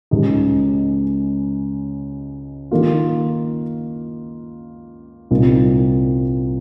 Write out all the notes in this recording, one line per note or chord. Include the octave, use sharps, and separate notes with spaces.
C#2 C#3 G#3 D#4 G4
D#3 A#3 F4
C2 A#2 G3 C4 D#4